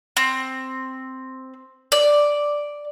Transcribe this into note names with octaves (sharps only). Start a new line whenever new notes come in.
C4
D5